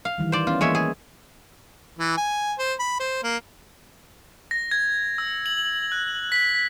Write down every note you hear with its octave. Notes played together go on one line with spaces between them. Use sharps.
F5
D#3 E3 G3
C5 D5
B3 C#4 E4 F4
E3 G#3 A#3 C#5 E5
G#4
E3
G#5
C5
B5
C5
A#3
A#6
G#6
E6
F#7
F#6
B6
B6